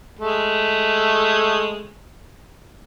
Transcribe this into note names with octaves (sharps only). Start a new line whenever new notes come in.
G#3 A3